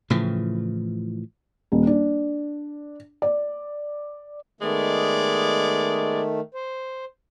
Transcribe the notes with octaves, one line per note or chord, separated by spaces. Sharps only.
A2 C#3 E3 F3
D#1
D4
D5
D#3 G#3 A3 B3 D5
C5